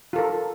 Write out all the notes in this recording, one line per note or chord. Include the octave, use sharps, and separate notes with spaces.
F4 A4 A#4